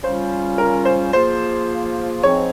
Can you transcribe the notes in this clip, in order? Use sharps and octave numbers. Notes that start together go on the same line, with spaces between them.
C#3 G3 C#4 F4 C5
A#4
C5
F3 A#3 F4 G#4 C5
G#2 F3 C4 C#5